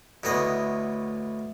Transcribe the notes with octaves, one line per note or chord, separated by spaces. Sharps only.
D2 A2 B3 D#5 G#5